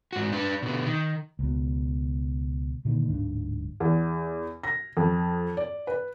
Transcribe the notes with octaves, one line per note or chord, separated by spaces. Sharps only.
G#2 F#4
D4 B4
B2 D3
D#3
C#2 B2
A#2 D3 D#3 A#3
D1 G#2 D4
E2
A#6
F2
D5
B4